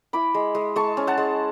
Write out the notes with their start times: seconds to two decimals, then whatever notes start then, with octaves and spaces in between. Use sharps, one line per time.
0.13 E4 B5 D6
0.34 G#3
0.55 G#3
0.76 G#3 A5 C#6
0.97 C#4
1.07 F#5 A5
1.18 G#3